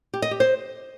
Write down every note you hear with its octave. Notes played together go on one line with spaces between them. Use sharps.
G4
D#5
G4
C5